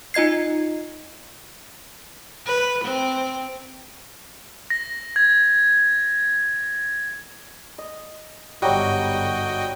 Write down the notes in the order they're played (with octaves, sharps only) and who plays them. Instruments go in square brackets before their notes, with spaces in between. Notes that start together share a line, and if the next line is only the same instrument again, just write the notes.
[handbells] D#4 F4 D#5 G#6 C7
[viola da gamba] B4
C4
[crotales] A#6
G#6
[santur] D#5
[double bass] G1 G#2 [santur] F#3 G3 [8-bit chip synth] F#4 D#5 G5